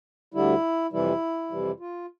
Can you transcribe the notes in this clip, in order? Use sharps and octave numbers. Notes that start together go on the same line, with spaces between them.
D2 D3 G3 E4
F2 C3 E3 G3 E4
F2 C3 E3 G3
F4